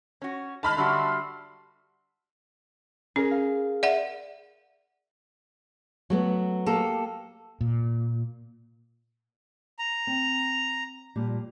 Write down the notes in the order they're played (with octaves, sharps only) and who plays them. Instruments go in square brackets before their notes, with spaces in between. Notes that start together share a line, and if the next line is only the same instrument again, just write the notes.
[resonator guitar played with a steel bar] C#4 F#4
[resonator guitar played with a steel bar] D#3 G#3 D#4 [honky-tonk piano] A5 B5 F6
[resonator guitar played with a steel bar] D3 G3 F#4 [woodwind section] E5 C6
[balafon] C#4 [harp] G#4 A#4
[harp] F5
[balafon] D5 E5 F#5
[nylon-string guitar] F#3 A3 B3
[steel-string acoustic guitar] A#3 G4 A4
[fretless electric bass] A#2
[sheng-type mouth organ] A#5
[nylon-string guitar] C4
A#2 F3 G3